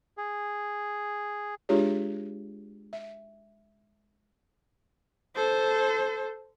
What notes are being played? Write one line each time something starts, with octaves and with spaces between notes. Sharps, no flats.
G#4
G#3 D4 F4 G4 G#4 C#5
E5
A4 C5